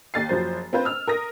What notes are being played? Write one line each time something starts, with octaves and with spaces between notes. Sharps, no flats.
D#2 A6 C7
F#1 F3 F#3 C5
C4 F4 B4 C5
E6 F6
A#4 D#6 A#6